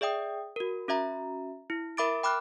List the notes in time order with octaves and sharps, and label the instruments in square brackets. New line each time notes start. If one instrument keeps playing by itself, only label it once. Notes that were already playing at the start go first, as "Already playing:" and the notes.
[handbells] G#4 D5 E5 G5 D#6
F#4 A#4
C#4 F#4 E5 A#5
E4
A#4 E5 B5 D6 A6 D7
G5 B5 D6 F6 F#6